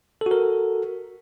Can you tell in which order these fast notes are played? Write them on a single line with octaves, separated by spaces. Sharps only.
A4 F#4 A#4